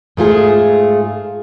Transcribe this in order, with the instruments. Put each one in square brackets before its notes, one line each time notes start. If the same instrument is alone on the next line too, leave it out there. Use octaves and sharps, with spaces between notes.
[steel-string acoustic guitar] G#2 A3 F4 G#4